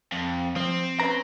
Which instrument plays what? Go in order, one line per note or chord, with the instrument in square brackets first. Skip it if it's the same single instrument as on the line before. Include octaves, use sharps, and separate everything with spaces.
[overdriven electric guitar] F2
[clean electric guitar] F3 [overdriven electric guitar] C4
[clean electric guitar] C#4 B4 A#5